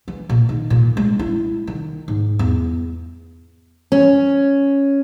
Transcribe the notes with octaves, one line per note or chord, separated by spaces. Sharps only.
E3
A#2
D#3
A#2
G#3
E4
D#3
G#2
E2
C#4